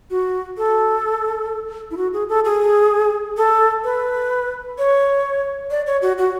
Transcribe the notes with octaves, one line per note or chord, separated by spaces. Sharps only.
F#4
A4
E4
F#4
G#4
A4
G#4
A4
B4
C#5
D5
C#5
F#4
F#4